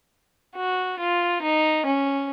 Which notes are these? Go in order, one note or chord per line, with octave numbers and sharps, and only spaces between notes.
F#4
F4
D#4
C#4